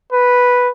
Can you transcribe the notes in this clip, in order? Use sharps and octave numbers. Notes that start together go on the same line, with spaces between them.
B4